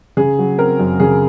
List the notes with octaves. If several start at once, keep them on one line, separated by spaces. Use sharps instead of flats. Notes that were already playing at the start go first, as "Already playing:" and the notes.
C#3 G#4
F#3
C4 A#4
F#2
C#3 G#4